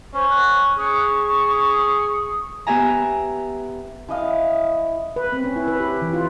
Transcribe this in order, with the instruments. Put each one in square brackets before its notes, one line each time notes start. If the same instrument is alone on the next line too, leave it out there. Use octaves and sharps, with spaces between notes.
[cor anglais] C#4 [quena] C5
[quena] F#6
[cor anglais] G#4 [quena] C#6
[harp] B3 G4 E5 G#5 A#5
[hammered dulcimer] E3 D#5 F5
[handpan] B4
C4
C#4
E4
B4
G4
E3
F4